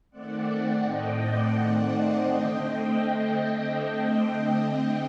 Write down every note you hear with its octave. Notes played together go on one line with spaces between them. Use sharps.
D#3 A3 C4 D5 F#5
A2 A3 C4 D#5 G5
D5 F#5
D#3 A3 C4 D5 F#5
C5 D#5
D3 A3 C4 D#5 G5